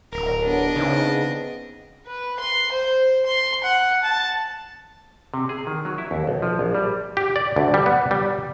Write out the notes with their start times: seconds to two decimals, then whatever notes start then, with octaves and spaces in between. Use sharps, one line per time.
0.13 D1 A#4
0.43 B3 D4 C#5 D#5
0.76 C#3 B3 C4 D#4
2.07 B4
2.39 C6
2.72 C5
3.26 C6
3.64 F#5
4.04 A5
5.34 C3
5.49 G#4
5.67 D#3
5.85 F#3
5.98 E4
6.11 D#2
6.27 B1
6.42 F3
6.59 A#1
6.75 G3
7.17 G4
7.36 D5
7.56 D2
7.74 G3
7.86 B3
8.11 G3